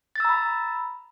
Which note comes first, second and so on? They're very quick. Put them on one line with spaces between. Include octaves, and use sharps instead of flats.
A6 E6 A#5 B5